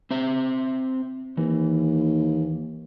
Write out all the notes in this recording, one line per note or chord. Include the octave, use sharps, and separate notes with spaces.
C4 C5 E5
D#2 E3